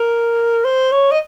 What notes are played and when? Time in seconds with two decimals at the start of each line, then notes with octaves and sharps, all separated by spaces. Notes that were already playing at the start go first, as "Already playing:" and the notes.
Already playing: A#4
0.65 C5
0.92 C#5
1.11 D#5